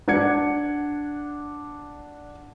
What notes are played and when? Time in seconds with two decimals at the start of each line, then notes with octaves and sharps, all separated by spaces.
0.08 D4 F#5 G#6 C#7